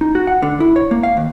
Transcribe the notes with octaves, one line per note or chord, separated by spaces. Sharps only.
D#4
F#4
F#5
D3
E4
C#5
A#3
F5
D#2